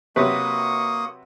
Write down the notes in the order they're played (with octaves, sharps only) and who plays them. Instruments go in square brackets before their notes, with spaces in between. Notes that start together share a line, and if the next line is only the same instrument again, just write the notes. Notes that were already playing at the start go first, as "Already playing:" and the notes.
[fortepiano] C3 F#3 B4 [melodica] A#3 C#6 D#6